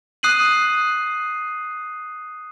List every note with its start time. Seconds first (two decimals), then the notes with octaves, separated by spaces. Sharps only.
0.23 D#6 F#6 C7 D#7 F#7